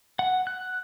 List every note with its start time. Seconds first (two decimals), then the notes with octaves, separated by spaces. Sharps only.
0.19 F#5
0.47 F#6